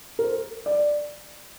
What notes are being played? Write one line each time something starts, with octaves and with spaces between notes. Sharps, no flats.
A#4
C5
D5